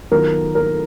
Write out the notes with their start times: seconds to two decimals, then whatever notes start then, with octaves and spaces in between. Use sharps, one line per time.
0.11 D#3 F#3 B3 F4 A#4
0.55 A#4